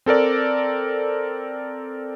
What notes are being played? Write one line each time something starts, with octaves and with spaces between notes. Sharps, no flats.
C4 A4 A#4 D5